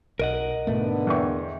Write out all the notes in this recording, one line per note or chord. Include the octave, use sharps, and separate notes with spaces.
B1 A#4 D#5 F#5
G#2 B2 D3 A3 B3
E2 G5 C#6